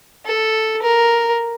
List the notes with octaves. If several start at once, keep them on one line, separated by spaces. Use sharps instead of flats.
A4
A#4